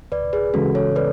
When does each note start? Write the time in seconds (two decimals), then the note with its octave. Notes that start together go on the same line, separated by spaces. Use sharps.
0.12 D2 B4 D5
0.33 G#4 B4
0.54 C#3 E3 G#3 C#4 F#4 A4
0.75 A4 C#5
0.96 B4 D5